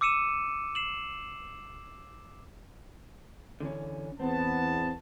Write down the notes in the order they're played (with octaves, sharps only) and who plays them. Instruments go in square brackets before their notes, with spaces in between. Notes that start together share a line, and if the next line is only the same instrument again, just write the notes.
[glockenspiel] D6 E6 C#7 D#7 E7
C7 E7 F#7
[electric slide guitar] D3 E3 C#4
[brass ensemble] E2 B3 A5 [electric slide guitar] C4